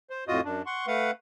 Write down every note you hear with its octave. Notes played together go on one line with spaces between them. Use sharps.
C5
F2 A2 F4 F#4 D#5 D#6
F#2 D4
F#5 C6 C#6
A3 B4 F5 F#5